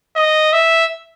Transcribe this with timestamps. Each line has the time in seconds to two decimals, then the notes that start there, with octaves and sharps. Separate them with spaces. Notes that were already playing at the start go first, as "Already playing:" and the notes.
0.16 D#5
0.53 E5